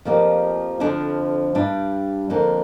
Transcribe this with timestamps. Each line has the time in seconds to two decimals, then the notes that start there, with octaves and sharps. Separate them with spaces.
0.05 F2 F3 A#3 G4
0.80 F2 D3 F3 D4
1.55 G2 G3 D4
2.30 F2 D3 A#3